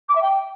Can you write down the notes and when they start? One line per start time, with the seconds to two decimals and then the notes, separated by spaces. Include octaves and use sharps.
0.08 D6
0.15 E5
0.22 G5